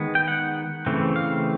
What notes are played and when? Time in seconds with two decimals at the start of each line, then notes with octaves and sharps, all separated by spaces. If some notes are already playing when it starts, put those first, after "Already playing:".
Already playing: D#3 G#3 B3
0.15 G5
0.28 F#5
0.86 C#3 E3 A3 C4
1.16 F5